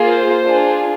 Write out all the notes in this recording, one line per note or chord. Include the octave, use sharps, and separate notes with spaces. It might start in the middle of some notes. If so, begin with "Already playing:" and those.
Already playing: A#3 F4 G#4
C5
D4 F4 G#4